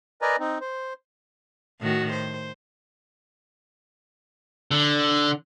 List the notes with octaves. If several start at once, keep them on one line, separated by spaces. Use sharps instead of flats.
A#4 B4 D5 D#5 G#5 A#5
C4 D#4
C5
A2 D#3 F#4
C5
D3